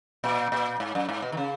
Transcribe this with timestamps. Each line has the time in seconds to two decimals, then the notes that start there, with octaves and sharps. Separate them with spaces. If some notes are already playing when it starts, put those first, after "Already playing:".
0.24 A#2
0.52 A#2
0.80 G#2
0.95 F#2
1.09 G#2
1.22 B2
1.32 D#3
1.37 C#3